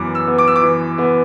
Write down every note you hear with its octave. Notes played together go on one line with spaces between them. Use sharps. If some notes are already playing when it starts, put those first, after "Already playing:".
Already playing: F#2 E3 B3 D6
E6
B3
D6
E6
D6
E3
B3